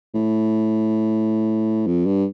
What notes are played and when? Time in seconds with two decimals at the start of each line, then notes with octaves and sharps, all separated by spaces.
0.14 A2
1.87 F2
2.06 G2